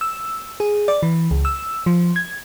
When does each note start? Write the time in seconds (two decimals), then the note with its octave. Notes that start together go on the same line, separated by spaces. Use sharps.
0.01 E6
0.60 G#4
0.88 D5
1.03 E3
1.31 C#2
1.45 E6
1.86 F3
2.16 G#6